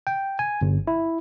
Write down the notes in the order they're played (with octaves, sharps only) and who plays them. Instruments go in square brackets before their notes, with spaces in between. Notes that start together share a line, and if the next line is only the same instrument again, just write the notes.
[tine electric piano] G5
G#5
G1
E4